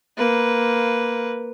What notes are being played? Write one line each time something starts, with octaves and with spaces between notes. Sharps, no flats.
A#3 B4